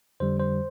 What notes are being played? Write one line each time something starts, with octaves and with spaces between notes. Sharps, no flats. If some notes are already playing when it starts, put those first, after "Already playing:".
F2 D3 G3 C5
C5